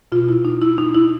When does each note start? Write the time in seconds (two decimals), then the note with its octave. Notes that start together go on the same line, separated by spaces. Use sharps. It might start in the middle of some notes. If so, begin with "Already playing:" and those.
0.12 B2 F4
0.29 E4
0.45 D#4
0.61 E4
0.78 D#4
0.94 E4